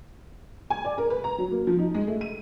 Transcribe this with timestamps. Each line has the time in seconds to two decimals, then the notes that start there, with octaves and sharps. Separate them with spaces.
0.70 G#5
0.85 D5
0.98 A#4
1.10 B4
1.24 A#5
1.38 F#3
1.51 A#3
1.67 F3
1.79 D#4
1.95 G#3
2.07 A3
2.21 D#7